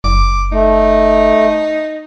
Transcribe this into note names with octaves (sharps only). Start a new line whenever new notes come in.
F#1 D6
A3 D#4